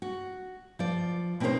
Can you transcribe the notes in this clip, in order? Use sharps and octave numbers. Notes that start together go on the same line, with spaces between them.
F#4
F3 D5
B2 C4 C#4 D#4 A#4 C5